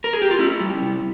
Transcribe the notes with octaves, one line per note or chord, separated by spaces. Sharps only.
A#4
G#4
G4
F4
C#4 E4
G3
C3